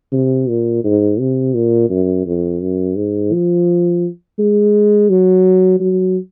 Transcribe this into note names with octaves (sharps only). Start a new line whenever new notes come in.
C3
A#2
G#2
C3
A#2
F#2
F2
F#2
G#2
F3
G#3
F#3
F#3